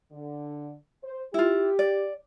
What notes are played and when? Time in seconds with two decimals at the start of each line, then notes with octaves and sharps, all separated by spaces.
0.12 D3
1.04 C5
1.34 E4 F4 G4
1.79 D5